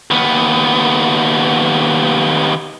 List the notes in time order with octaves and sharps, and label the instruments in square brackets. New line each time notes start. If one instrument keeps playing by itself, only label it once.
[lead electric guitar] D#2 B3